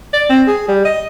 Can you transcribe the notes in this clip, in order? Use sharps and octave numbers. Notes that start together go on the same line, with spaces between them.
D5
C4
G#4
G3
D#5